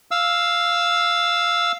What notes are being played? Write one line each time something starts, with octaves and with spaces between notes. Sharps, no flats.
F5 E6